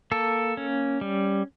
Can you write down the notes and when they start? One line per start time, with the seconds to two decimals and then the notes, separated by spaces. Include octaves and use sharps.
0.11 A#3 A4
0.57 C#4
1.01 G3